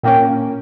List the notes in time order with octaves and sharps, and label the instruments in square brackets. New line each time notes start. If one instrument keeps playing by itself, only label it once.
[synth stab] A#2 A#3 C#4 [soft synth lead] G5